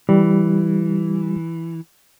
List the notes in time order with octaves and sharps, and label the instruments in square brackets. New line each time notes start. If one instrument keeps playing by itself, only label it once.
[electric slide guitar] E3 [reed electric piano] G3